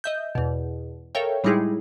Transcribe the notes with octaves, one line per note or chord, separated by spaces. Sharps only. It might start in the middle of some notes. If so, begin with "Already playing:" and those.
D#5 E5 G6
E2 B2
A4 A#4 C#5 E5 F5 G5
A2 G3 G#3 D#4 E4 G#4